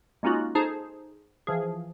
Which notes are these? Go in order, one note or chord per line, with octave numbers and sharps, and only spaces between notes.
G#3 A#3 C#4 D#4 F4 F#4
D#4 G#4 A4 C5 A5 A#5
E3 F3 G#4